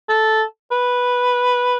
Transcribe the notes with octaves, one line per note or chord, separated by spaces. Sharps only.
A4
B4